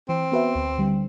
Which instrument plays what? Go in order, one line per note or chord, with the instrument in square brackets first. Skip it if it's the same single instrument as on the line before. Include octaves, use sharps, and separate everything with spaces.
[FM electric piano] E3 [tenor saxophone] C4
[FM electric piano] B3 F#4 B4 E5
D2
D3 G3